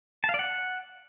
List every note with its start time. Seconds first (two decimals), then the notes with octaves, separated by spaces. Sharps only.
0.24 A5
0.29 F5
0.34 D5
0.39 F#5